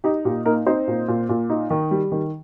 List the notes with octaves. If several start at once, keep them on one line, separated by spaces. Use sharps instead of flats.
D#4 G4
A#2 G4
A#3 D#4 A#4
C4 D#4 C5
A#2
A#2
A#2
D#4
D#3
G3
D#3